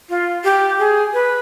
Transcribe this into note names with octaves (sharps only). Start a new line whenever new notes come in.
F4
G4
G#4
B4